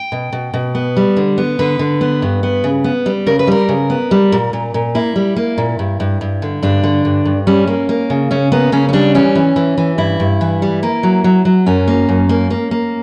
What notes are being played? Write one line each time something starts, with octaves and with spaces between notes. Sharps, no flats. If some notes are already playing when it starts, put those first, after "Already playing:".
Already playing: G5
B2
B2
B2
B3
G3
D3
B3
D3 B4
D3
B3
G2
B3
C#3
B3
G3
C#3 A#4
B4
G3 A#4
C#3
B3
G3
A#2
A#2
A#2
A#3 E4
G3
A#3
A#2
G2
G2
G2
D3
G2 D4
D3
G2
G2
G3 C#4
A#3
A#3
C#3
C#3 C#4
A#3 B3
C#3 C#4
C#4
G3 D4
E3 C#4
E3
E3
E3
G2 E4
G2
E3
G3
A#3
F#3
F#3
F#3
F#2 C#4
A#3
F#2
A#3
A#3
A#3